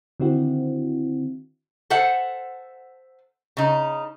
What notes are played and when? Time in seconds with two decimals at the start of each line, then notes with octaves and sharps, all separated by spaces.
0.20 D3 D#3 C4 E4 F#4
1.90 A4 C5 E5 F#5
3.57 C#3 D#4